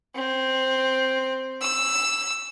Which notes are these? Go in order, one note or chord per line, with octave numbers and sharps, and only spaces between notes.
C4
E6